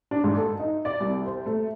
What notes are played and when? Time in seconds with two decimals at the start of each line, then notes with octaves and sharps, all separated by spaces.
0.11 D4
0.24 G#2
0.37 A4
0.59 D#4
0.85 D5
1.00 C2
1.26 C5
1.46 A3